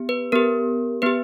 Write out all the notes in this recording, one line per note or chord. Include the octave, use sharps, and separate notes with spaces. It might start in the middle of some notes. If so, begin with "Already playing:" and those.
Already playing: B3 G4
B4
B3 G4 A#4
B3 G4 B4